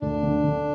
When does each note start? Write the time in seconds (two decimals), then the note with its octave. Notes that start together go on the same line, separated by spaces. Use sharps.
0.01 D2 D4
0.23 D3
0.44 D3